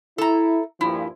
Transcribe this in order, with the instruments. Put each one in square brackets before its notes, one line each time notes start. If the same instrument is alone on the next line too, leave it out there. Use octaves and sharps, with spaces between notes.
[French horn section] E4 [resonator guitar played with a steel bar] A4 A#5
[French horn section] G2 A#2 F3 [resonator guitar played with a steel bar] E4